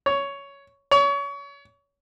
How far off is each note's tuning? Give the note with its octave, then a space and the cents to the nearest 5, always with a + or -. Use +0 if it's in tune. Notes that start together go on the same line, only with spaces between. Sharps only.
C#5 +10
C#5 +30